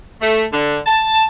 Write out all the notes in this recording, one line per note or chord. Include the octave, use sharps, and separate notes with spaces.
A3
D3
A5